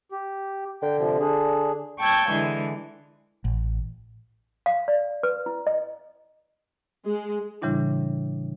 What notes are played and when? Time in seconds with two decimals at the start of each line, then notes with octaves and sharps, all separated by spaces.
0.12 G4
0.82 D3 G5
0.99 C3 F3
1.20 D4 G#4
2.01 G5 A5 C#6 E6 G6 G#6
2.31 D3 E3 G#3
3.45 A1
4.66 F5
4.88 D5
5.23 B4
5.46 E4
5.67 D#5
7.05 G#3
7.62 A2 C#3 E3 G3 D4 E4